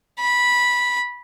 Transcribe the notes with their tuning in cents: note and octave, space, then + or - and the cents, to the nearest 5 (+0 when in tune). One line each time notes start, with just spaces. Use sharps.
B5 -10